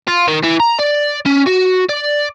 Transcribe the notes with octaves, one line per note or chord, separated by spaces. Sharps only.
F4
D#3
E3
A#5
D5
C#4
F#4
D5